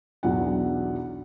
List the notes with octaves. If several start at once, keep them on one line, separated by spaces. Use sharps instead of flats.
B1 E2 F#3 D4 E4 F#5